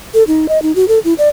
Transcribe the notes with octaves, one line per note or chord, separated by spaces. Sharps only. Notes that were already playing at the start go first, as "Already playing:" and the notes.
A4
D#4
D#5
D#4
F#4
A4
E4
D5